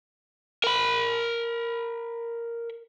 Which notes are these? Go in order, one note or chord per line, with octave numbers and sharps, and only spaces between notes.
A#4 B5